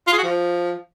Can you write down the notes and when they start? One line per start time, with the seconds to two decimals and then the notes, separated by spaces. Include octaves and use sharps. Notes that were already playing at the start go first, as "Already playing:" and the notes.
0.07 F4
0.13 G#4
0.18 F#4
0.23 F3